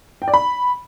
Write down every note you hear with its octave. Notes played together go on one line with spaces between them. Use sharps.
G5
D5
B5